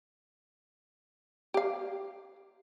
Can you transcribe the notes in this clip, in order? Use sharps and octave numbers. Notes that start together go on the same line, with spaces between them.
G4 F5